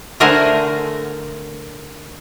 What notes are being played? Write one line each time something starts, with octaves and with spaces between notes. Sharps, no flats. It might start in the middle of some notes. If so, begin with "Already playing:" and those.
D3 A3 A#4 C5 F#5 G#5